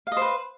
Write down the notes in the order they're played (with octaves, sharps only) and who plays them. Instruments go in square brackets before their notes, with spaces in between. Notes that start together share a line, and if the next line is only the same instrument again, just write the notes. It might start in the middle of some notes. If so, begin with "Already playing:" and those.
[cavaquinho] F5
D#5
C5
B4